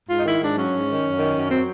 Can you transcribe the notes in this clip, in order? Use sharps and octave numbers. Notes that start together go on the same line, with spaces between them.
G#2 F4
D#4
D#3 E4
G#2 D4
F#3 C#4
G#2
D#3
F#2
D#3
F#2
F#3 C4